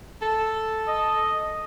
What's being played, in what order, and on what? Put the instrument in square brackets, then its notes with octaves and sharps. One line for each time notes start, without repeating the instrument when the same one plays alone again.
[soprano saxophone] A4
[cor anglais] D#5